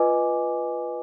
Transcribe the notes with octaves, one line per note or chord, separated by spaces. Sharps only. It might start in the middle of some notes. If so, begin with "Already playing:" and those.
Already playing: F4 B4 D#5 G#5 D6